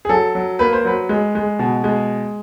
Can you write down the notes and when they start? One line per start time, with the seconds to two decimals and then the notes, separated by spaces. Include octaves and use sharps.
0.05 G#4
0.09 F#3 A4
0.35 F#3
0.59 A#3 B4
0.73 C5
0.85 F#3 B4
1.09 G#3
1.35 G#3
1.59 B2
1.84 G#3